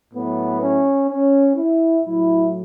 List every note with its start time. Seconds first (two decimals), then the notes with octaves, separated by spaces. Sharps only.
0.14 A2 F#3 B3
0.61 C#4
1.09 C#4
1.56 E4
2.03 A2 F#3 E4